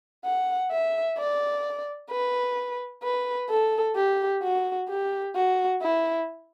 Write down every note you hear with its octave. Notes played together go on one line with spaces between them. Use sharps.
F#5
E5
D5
B4
B4
A4
G4
F#4
G4
F#4
E4